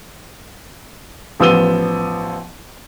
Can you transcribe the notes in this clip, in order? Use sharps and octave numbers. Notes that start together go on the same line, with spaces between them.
A1 F3 B3 E6 D#7 G7